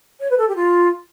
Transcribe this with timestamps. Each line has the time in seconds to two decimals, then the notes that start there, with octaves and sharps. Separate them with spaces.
0.21 C#5
0.30 B4
0.38 A4
0.47 G4
0.56 F4